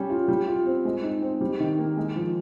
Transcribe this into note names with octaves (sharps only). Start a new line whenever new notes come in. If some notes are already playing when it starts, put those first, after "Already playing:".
Already playing: G3 C#4
F4
G3
F4
C4
G#3
D#4
C4
G3
D#3
A#3
G#3
F3